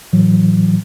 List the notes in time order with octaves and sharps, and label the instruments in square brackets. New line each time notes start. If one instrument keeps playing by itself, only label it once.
[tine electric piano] A2 E3 F#3